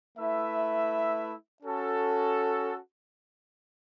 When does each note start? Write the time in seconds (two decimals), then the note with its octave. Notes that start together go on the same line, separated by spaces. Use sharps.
0.18 A3 E4 B4 E5
1.63 C#4 F#4 A4